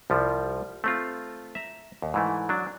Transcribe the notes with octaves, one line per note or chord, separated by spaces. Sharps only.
C2 F3 G3
A3 C4 F4
E5 A#5
D#2
G#2 E3 A3
F#3 D4